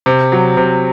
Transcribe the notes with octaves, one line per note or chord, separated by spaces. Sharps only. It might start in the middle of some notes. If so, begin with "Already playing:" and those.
C3
F#3
C3